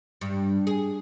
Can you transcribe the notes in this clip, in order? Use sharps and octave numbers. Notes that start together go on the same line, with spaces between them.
G2
G#4